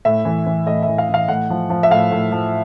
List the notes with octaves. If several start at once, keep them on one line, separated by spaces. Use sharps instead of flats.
A2 E5
E3
E3
A2 D#5
E5
E3
F5
E3
F5
A2 F#5
F3
F3
E5
A2 F5
A2
F3